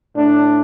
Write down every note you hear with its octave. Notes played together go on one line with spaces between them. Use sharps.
A2 A3 D4